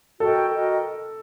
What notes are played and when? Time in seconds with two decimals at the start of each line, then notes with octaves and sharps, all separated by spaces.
0.19 F#4 A4 A#4 D#5 G5
0.52 F#4 A#4 D#5 G5